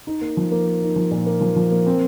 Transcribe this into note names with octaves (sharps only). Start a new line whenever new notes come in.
D#4
A#3
F3
A#3
A#3
D#4
F3
A#2
A#3
F3
F3
A#3
C4